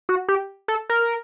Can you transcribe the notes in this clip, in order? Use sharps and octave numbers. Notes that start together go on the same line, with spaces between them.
F#4
G4
A4
A#4